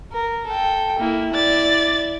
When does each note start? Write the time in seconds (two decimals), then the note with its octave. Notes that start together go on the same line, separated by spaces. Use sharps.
0.13 A#4
0.46 A4 G5
0.99 A#3 E4
1.34 D5 A6